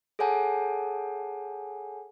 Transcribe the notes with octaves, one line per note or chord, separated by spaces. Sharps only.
G#4 A4 C#5 F#5 G#5 A5